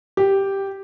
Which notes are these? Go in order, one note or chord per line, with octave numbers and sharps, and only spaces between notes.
G4